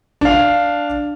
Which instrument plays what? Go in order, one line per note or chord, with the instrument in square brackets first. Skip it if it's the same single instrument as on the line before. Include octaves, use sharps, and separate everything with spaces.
[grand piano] D4 F5